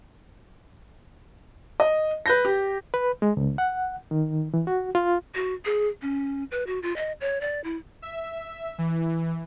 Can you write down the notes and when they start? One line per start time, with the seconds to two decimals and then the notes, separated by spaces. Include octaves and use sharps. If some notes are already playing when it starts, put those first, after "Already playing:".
1.80 D#5
2.26 B4 G6 A#6
2.45 G4
2.94 B4
3.22 G#3
3.37 C#2
3.58 F#5
4.11 D#3
4.54 E3
4.67 F#4
4.95 F4
5.35 F#4
5.65 G#4
6.02 C#4
6.52 B4
6.67 F#4
6.83 F4
6.96 D#5
7.21 C#5
7.41 D5
7.64 E4
8.02 E5
8.78 E3